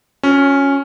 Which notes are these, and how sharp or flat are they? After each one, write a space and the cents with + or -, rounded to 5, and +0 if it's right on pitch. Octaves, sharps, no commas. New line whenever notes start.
C#4 +0 F#4 -40